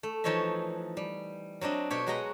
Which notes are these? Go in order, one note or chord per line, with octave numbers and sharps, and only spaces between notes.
A3
E3 F3 D#4 C#5 D#5 E5
G3
F#3 C4 D4 D#5
B2 G4 C#5
F#3 G#3 F#4 B4 D#5 A#5